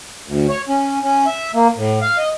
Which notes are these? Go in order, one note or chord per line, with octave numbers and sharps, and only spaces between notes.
D2
C#5
C#4
C#4
E5
A#3
A2
F5
D#5